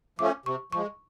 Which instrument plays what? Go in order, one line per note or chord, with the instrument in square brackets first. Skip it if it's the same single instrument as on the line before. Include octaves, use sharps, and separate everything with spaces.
[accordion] F3 A3 C#4 [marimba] D6
[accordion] C3 [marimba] C#6
[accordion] F3 [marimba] C#6
[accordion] G#3